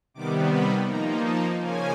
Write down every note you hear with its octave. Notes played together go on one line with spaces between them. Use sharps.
C3 D#3 G3 B3 D6
B5
F3 A#3 D#4 A#5
A5
C#3 F3 A#3 C#4 G#5